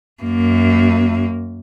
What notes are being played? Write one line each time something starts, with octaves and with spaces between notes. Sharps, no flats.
F#2 A#3